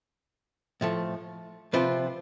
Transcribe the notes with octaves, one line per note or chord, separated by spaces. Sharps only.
A2 F3 A3
C3 F3 C4 F4 B4